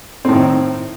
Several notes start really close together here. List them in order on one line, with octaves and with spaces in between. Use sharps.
C4 A2 D#3